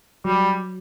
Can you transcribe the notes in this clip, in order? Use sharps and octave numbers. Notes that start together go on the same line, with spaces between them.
F#3 G3